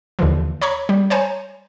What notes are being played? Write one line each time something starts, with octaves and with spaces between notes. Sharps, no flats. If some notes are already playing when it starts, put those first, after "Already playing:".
D#2 D3 E3 F3
C#5 A#5 B5 C#6
G3
C5 C#5 G#5 A#5